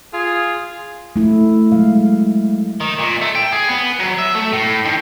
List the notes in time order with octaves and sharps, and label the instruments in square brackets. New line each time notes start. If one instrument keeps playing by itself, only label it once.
[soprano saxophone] F4 [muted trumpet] G#4
[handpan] A3 E4
F#3 G#3 F5
[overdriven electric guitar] D#3
A#2
A3
G5
G#4
B3
F#3
E5
A3
A2
D#3